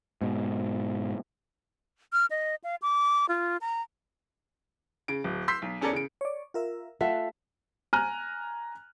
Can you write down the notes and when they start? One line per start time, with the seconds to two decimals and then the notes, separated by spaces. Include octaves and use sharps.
0.21 G#2 B2
2.13 F6
2.30 D#5
2.64 F5
2.82 D6
3.29 F4
3.61 A#5
5.08 C#3 D7
5.24 D1
5.48 C6 E6 G6 B6 C7
5.62 B1
5.81 E2 C#4 A4 A#4 D5 C#7
5.93 C#3 D7
6.21 C#5 D5
6.54 F4 A#4 E5
7.01 A3 F4 A4 E5 F#5
7.93 G#5 A#5 F6 F#6 D#7